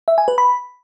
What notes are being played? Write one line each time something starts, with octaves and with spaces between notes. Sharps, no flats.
E5
G#5
B4
B5